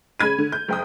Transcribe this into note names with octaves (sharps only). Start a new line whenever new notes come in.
C#3 B5 G#6 D#7
D3
G6
F#1 G5 D#6